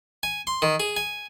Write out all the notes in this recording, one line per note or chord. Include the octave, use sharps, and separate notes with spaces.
G#5
C6
D#3
G#4
G#5